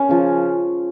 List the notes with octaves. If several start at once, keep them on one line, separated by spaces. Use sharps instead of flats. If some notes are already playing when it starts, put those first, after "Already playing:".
Already playing: C#4
C#3 F3